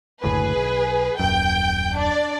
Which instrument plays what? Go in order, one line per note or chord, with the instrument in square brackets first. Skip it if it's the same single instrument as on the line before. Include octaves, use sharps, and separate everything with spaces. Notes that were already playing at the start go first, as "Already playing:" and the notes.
[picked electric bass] F#1 D2 A2 [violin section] G#4 B4
[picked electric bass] B1
[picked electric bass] D#1 F#2 [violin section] G5 G6 D7
[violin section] D4 D5